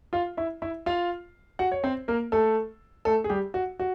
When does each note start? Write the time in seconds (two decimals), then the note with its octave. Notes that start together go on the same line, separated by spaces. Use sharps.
0.13 F4 F5
0.37 E4 E5
0.62 E4 E5
0.86 F4 F5
1.59 F#4 F#5
1.72 C#5
1.84 C4 C5
2.08 A#3 A#4
2.32 A3 A4
3.05 A3 A4
3.24 G#4
3.30 G3 G4
3.54 F#4
3.80 F#4